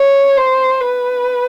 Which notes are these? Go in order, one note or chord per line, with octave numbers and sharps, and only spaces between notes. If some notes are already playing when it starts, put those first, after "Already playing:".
Already playing: C#5
C5
B4